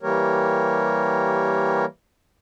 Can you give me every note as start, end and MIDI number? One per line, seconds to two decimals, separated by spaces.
0.03 1.85 52
0.03 1.85 55
0.03 1.85 58
0.03 1.85 67
0.03 1.85 70
0.03 1.85 73